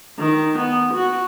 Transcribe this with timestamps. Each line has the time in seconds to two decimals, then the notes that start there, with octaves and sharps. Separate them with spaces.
0.19 D#3
0.58 B3
0.94 F#4